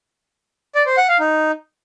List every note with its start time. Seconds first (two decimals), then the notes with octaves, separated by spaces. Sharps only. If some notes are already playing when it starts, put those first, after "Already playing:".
0.75 D5
0.86 C5
0.97 F#5
1.09 F5
1.20 D#4